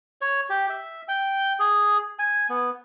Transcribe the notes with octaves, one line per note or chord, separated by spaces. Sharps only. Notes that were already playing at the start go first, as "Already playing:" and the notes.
C#5
G4
E5
G5
G#4
G#5
B3